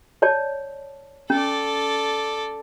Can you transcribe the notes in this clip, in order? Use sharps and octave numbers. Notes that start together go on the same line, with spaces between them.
C#5 D5 A5
C#4 A4 D5